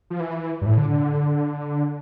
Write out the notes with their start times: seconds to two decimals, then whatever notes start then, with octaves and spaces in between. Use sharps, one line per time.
0.10 F3
0.20 E3
0.61 G2
0.66 A2
0.78 D3
0.89 D3